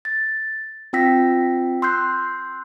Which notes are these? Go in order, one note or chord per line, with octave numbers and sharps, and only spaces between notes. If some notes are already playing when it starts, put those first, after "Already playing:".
A6
C4 F4 G5 E6 A#6 B6
C6 E6 F#6 G6 C7